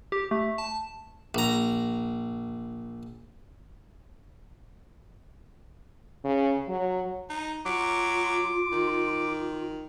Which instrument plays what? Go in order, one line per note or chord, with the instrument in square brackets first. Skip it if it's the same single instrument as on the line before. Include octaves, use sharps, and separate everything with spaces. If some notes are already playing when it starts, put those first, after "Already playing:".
[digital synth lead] G4
A3
A5
[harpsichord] A#1 A#5
[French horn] C#3
F#3
[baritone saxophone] D#4
[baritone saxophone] F#3 [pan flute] F4 [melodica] D6
[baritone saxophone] D#3